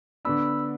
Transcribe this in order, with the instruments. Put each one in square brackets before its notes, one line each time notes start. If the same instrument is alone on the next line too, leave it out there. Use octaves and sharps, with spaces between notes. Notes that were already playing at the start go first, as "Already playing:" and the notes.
[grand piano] D3 B3 D4 [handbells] B5 E6